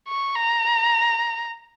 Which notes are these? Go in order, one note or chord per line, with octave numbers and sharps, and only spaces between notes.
C#6
A#5